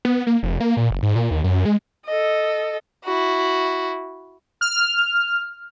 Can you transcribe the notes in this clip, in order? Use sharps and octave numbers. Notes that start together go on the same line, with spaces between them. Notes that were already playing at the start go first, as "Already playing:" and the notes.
B3
A#3
F1
A#3
A#2
F#1
G#2
A#2
D#2
F#2
G#3
A4 D#5
E4 F#4
F6